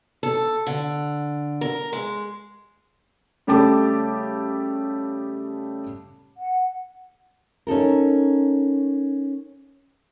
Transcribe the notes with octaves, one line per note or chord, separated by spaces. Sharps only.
A4
D3
A#4
G#3
C#3 G3 A3 G4 A5 D6
F#5
C#4 D#4 A4 A#4